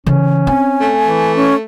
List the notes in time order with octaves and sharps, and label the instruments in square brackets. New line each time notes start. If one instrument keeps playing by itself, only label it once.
[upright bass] C#3 E3 [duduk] C#4
[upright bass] C4 [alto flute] G#5
[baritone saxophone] A3
[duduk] E3
[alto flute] C#4